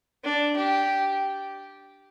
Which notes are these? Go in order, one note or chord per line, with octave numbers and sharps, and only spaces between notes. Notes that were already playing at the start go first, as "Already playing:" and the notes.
D4
G4